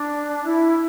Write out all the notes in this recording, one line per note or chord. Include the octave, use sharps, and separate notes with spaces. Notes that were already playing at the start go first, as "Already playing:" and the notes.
Already playing: D4
E4